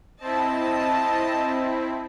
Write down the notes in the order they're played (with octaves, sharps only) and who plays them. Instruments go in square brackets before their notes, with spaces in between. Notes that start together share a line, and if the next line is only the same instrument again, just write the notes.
[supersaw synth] C4 E4 [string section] D#5 A5